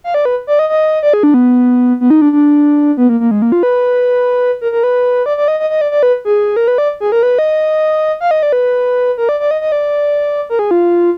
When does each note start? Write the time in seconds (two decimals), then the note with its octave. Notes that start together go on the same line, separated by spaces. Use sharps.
0.04 F5
0.14 D5
0.25 B4
0.47 D5
0.59 D#5
0.69 D#5
1.03 D5
1.14 G#4
1.23 D4
1.34 B3
2.01 B3
2.10 D#4
2.22 D4
2.32 D4
2.97 B3
3.09 A#3
3.20 A#3
3.31 G#3
3.42 A#3
3.52 F4
3.63 B4
4.61 A#4
4.72 A#4
4.83 B4
5.26 D5
5.37 D5
5.48 D#5
5.60 D#5
5.70 D#5
5.81 D5
5.91 D5
6.03 B4
6.25 G#4
6.56 A#4
6.68 B4
6.78 D5
7.00 G#4
7.12 A#4
7.23 B4
7.39 D#5
8.21 F5
8.31 D#5
8.43 D5
8.52 B4
9.18 A#4
9.29 D5
9.40 D5
9.51 D#5
9.61 D#5
9.72 D5
10.49 A#4
10.59 G#4
10.71 F4